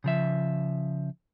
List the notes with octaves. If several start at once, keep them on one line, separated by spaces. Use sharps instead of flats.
C#3 F3 E5